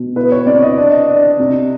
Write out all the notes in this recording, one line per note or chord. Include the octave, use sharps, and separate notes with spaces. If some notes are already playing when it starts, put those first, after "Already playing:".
Already playing: B2
E4 B4
C#5
C4 D5
D#5
D4
D4
C3